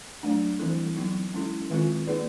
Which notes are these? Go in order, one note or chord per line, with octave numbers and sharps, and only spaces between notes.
F#3 A3 D4
E3 G3 C4 E4 A4
F#3 B3 D#4
G#3 C#4 E4 A4
D#3 G#3 C4 F4 A4
A#3 D#4 G#4 B4 D5